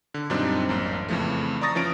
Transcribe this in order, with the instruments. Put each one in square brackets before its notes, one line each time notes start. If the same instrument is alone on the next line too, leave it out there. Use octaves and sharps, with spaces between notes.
[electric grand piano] D3
F#2 A#2 G3 C4 D4 D#4
A1 F#2 A#3
F2 C#3 E3 F3 A3
D5 A#5 C#6 D#6 A6 A#6
E3 F3 C#4 D7